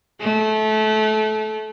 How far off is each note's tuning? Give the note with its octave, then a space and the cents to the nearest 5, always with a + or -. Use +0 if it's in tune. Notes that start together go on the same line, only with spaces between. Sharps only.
A3 -25